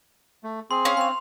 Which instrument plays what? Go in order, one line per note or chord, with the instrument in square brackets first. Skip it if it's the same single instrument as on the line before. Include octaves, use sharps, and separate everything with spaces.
[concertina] A3
[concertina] C4 G#4 [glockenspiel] C6
[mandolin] C#4 F5
[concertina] C4 [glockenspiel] C6 F7